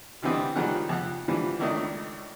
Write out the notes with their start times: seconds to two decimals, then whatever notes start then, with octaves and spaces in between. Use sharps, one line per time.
0.22 B2 D3 E3 G3 C4 D#5
0.55 C#2 D#3 F3 G3 G#4 F#5
0.89 F2 F#5
1.28 D3 E3 F3 G3
1.60 G#1 C#2 D#3 A3 D4 D#5